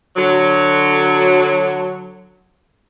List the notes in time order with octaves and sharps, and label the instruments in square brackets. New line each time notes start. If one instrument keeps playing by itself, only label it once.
[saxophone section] D3 F#3